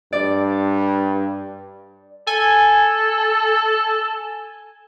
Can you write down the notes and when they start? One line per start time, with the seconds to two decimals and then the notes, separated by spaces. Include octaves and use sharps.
0.13 G2 D5
2.27 A4 G#5